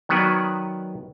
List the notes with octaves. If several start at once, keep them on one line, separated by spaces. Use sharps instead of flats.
D#3 F#3 B3 F#4 B4 D5